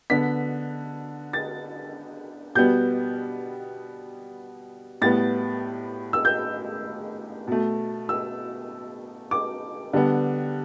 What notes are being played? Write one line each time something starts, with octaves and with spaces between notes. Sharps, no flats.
D3 B3 B6
A6
B2 G3 B3 G6
A2 G3 B3 A6
E6
G6
B2 A3
E6
D6
D3 G3 B3